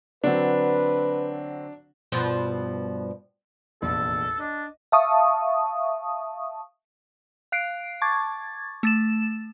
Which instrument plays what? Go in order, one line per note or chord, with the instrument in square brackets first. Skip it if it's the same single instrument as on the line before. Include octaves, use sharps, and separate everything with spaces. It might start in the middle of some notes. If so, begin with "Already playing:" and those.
[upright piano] D3 F#3 C4 [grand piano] D4 [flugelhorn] B4
[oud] G2 B2 F3
[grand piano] F1 A#1 E2 [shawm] A4
[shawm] D4 [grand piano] D#5
[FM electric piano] E5 F5 A5 C#6 D#6
[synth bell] F5 F#6 C7 D7
A5 C#6 D6 G#6 A6
A3 A6 E7